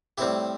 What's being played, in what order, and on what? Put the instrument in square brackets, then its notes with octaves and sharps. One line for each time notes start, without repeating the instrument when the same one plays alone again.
[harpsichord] A2 G3 C4 E4 G4